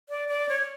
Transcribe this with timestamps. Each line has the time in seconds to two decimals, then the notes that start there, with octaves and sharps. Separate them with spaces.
0.09 D5
0.29 D5
0.49 C#5